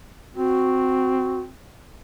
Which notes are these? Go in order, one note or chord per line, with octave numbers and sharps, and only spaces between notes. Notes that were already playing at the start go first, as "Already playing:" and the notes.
C4 F#4